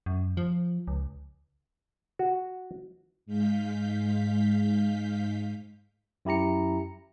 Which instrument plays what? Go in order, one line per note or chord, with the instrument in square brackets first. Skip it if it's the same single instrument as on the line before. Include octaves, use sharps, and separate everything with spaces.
[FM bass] F#2
F3
C#2
[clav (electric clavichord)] F#4
[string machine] G#2 G#3 F5 G6 B6
[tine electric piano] F#2 E4 G4 A#5 C#7